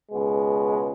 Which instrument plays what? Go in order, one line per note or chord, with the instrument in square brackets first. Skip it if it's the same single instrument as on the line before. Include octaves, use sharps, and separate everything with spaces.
[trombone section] C#2 B2 G#3